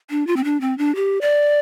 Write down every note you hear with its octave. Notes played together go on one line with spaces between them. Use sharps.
D4
F4
C4
D4
C4
D4
G4
D5